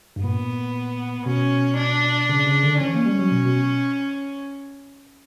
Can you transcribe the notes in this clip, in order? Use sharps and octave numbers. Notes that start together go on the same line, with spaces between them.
G2
A#2 B3
B2 C#4
D4
C#3
C#3
D3
E3 C#4
A#3
G3
F#3
B2
B2